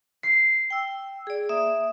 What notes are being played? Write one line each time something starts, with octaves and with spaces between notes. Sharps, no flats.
C7
G5 E6
G#4 D5
A#3 E5 D#6